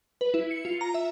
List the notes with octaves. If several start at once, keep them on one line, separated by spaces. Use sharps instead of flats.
B4
E4
C#7
F4
A#5
E5